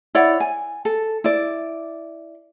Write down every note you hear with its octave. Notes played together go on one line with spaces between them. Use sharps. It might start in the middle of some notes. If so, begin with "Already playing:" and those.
E4 C#5 D5 F#5
G#5
A4
E4 D5